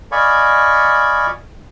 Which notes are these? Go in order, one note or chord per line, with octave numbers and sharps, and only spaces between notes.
D5 D#5 F5 G#5 B5 C#6